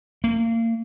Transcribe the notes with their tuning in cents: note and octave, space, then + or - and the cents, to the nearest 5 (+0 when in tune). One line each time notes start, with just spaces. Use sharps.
A#3 -30